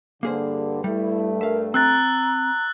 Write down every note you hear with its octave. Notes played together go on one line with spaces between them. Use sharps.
G2 D3 A#3 G#4 C5
G2 G3 A3 E4
A#4 E5 F5
C4 A#5 E6 F#6 A6